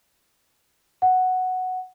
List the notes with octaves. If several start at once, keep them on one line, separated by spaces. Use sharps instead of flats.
F#5